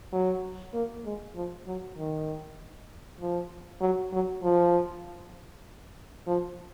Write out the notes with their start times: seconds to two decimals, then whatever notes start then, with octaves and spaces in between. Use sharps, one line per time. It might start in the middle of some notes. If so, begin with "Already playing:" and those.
0.12 F#3
0.74 A#3
1.05 G#3
1.35 F3
1.66 F#3
1.97 D#3
3.20 F3
3.81 F#3
4.12 F#3
4.43 F3
6.27 F3